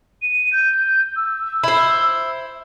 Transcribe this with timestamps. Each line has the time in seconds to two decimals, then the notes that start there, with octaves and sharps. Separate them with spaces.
0.22 D#7
0.53 G6
1.16 E6
1.64 E4 C5